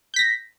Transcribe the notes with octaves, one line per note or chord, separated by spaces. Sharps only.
G6 A#6 B6